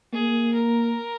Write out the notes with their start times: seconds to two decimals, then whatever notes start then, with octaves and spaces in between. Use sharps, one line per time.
0.13 A#3 G#4
0.53 A#4